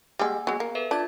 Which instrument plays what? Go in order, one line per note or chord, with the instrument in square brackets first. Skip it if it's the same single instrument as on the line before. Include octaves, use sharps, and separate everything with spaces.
[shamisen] G3 G#3 [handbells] A#3 F#5 G#5
[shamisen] F#3 G#3 [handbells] B3 G#4
[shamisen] A#3
[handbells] A4 B4 E5
[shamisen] D4 [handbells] F4 G#6 A6